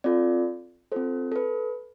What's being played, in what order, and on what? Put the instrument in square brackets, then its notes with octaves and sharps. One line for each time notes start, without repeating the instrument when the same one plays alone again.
[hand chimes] C4 F4 A4 D5
C4 F4 A4 C5
A4
B4